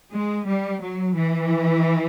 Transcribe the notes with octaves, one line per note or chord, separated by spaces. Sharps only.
G#3
G3
F#3
E3